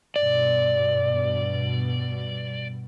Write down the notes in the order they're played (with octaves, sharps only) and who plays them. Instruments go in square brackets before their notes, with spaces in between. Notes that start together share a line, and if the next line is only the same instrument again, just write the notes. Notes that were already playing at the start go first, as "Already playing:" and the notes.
[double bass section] G2 B2 [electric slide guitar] D5